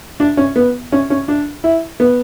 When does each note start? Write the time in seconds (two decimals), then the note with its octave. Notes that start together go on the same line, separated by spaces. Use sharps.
0.20 D4
0.37 C#4
0.56 B3
0.92 C#4
1.10 C#4
1.28 D4
1.64 E4
2.00 B3